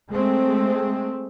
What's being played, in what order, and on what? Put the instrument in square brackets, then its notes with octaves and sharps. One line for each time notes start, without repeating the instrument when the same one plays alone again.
[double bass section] G#3 A3 C4